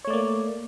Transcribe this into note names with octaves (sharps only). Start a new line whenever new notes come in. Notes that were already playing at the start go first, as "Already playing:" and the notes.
A3 A#3 C#5 D5